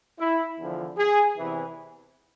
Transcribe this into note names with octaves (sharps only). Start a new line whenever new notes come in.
E4
E2 D3 F3
G#4
E2 C3 E3